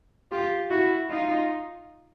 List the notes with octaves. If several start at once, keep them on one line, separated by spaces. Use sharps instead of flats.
F4 G4
E4 F#4
D#4 F4